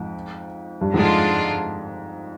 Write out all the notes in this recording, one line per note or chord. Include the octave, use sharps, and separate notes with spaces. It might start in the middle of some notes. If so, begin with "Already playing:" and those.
Already playing: F2 G#2
G2
F2 G#2 D3 G#3 D4 F4